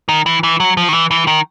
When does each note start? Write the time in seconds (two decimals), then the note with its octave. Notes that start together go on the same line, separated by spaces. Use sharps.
0.09 D#3
0.26 E3
0.43 E3
0.60 F#3
0.77 F3
0.89 D#3
0.93 E3
1.11 E3
1.27 D#3